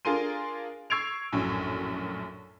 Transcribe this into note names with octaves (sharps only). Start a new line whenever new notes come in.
D4 F4 G#4 A#4 C6 D#7
C#6 E6 G#6 C7 D7 F7
A#1 F#2 A2